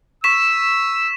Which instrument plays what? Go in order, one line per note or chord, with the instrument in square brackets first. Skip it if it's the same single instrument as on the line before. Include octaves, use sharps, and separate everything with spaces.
[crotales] C#6 B6 E7 [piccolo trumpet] E6